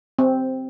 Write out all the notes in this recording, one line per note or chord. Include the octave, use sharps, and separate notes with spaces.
C4